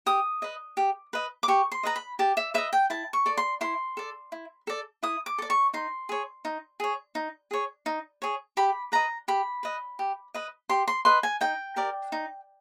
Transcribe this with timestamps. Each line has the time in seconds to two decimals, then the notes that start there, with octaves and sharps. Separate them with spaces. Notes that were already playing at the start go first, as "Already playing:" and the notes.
0.06 G4 D#6
0.42 B4 D#5
0.77 G4
1.13 B4 D#5
1.43 D6
1.48 G4 C#6
1.72 C6
1.83 B4 D#5 A#5
1.96 B5
2.19 G4 A5
2.37 E5
2.54 B4 D#5 E5
2.73 G5
2.90 E4 A5
3.13 C#6
3.26 A4 D5
3.37 C6
3.61 E4 C6
3.97 A4 D5
4.32 E4
4.67 A4 D5
5.03 E4 D#6
5.26 D6
5.38 A4 D5
5.50 C#6
5.74 D#4 C6
6.09 G#4 C#5
6.45 D#4
6.80 G#4 C#5
7.15 D#4
7.51 G#4 C#5
7.86 D#4
8.22 G#4 C#5
8.57 G4 B5
8.92 B4 D#5 A#5
9.28 G4 B5
9.63 B4 D#5
9.99 G4
10.34 B4 D#5
10.69 G4 C6
10.88 C6
11.05 B4 D#5 C6
11.23 G#5
11.41 D#4 G5
11.76 G4 A#4 D5
12.12 D#4